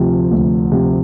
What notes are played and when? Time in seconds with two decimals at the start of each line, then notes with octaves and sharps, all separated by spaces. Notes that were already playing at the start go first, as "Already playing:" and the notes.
Already playing: D2 C3 F3
0.31 D2
0.72 C3 F3